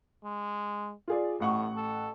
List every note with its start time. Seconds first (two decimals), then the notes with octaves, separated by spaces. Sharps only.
0.24 G#3
1.08 F4 G#4 D5
1.40 A1 A2 F#5 C#6
1.76 A4